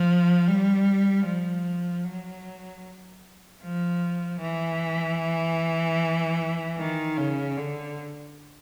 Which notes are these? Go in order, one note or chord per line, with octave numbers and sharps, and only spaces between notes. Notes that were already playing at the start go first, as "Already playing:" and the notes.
Already playing: F3
G3
F3
F#3
F3
E3
D#3
C#3
D3